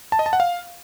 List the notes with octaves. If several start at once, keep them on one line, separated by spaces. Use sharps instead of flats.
A5
D#5
A5
F#5
F5